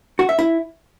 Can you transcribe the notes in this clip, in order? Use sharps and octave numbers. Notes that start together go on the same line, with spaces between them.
F#4
E5
E4